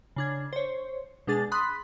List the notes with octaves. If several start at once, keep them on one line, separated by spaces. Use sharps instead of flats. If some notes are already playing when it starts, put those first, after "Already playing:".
C#3 D4 G#6
C5 C#5
B2 G#3 D4 G#4 A6
B5 C6 D#6 F#6 B6